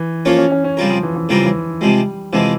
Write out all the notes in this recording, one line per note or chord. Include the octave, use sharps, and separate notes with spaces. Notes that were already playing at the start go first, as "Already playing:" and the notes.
Already playing: E3
F3 A#3 C#4 F4 A#4 C#5
C#4
C#4
C#4
C#3 G3 C4 F4 A#4
F3
E3
E3
C#3 E3 G3 C4 F4 A#4
E3
C3 F3 G3 G#3
C3 E3 F3 G#3